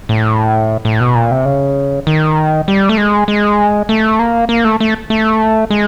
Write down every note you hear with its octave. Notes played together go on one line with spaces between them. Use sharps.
A2
A2
B2
A#2
C3
C#3
D#3
G3
A3
G#3
G#3
A3
A#3
A#3
A3
A3
A3
G#3